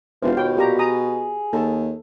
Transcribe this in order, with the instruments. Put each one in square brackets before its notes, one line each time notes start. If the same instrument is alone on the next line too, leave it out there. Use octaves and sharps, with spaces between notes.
[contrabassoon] E1 [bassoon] E3 [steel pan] F4 C5
[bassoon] D#2 [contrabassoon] B2 [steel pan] G5
[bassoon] A#2 [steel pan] F#4 G4 A#5
[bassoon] G#4 [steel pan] A#5 D#6
[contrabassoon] D#2 [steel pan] A4